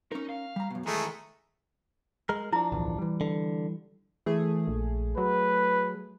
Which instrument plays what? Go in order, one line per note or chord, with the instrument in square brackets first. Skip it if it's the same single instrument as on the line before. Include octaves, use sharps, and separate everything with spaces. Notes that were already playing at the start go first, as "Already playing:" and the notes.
[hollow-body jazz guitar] C#4 A#4 [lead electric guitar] D#4
[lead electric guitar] F5
[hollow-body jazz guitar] G3 A#5
F#2 B2
[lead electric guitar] D#3 E3 [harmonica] G#3 A3 [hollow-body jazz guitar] A#5
[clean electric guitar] G#3 A#4
[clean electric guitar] F3 D4 [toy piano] E4 A#5
[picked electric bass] D1 B1 E2
E3 G3
[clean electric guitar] D3
[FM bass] E3 [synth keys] A3 G#4
[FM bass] A#1
[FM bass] F#3 [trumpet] B4